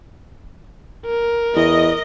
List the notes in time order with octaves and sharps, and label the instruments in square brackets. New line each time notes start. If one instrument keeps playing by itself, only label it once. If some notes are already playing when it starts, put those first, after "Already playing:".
[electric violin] A#4
[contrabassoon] E2 [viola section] D#5